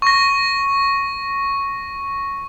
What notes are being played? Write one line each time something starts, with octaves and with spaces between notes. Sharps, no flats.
C#6 A#6